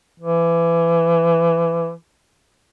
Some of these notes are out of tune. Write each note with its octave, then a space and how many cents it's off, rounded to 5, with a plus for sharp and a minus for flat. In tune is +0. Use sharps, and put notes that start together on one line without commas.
E3 +25